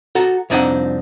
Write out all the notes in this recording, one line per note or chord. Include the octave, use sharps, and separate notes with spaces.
F#4 A4 A#5
C2 F2 C4 D4 D#4 F#5